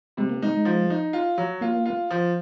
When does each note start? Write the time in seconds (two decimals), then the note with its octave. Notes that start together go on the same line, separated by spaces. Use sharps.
0.17 C3 G#3
0.30 A#3
0.42 G#3 D#4
0.54 G#3
0.65 F3
0.90 D#4
1.13 F4
1.38 F#3
1.61 A#3 F4
1.86 F4
2.10 F3